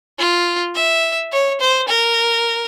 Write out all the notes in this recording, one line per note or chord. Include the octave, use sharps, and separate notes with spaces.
F4
E5
C#5
C5
A#4